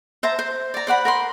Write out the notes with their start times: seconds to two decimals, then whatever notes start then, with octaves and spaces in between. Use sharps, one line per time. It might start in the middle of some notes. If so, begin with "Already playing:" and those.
0.23 C5 E5 A5 A#5
0.39 C5
0.74 D5 A#5
0.87 C5 D5 F#5 B5
1.05 A#4 B5 C6